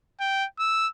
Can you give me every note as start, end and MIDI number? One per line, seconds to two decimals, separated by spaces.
0.20 0.46 79
0.59 0.88 88